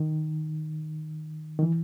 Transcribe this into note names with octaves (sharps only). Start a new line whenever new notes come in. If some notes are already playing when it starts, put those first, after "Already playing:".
Already playing: D#3
D#3
E3